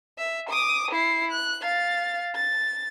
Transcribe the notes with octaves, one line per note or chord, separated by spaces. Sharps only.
E5
D6 D#6
E4 C7
F#6
F5 A6
A6